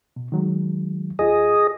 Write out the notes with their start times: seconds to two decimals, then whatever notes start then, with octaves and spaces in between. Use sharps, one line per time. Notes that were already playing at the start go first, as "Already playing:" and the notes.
0.16 B2
0.32 D#3 F#3 G#3
1.19 D#2 F4 G#4 D#5